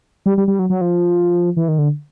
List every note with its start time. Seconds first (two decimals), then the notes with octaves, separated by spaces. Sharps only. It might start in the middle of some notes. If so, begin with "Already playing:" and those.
0.26 G3
0.38 G3
0.48 G3
0.59 F#3
0.70 F#3
0.81 F3
1.57 E3
1.68 D#3
1.78 D3